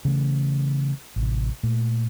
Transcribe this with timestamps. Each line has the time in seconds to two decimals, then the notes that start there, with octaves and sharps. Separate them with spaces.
0.05 C#3 E3 A3
1.16 A1 C3
1.63 A#2 A3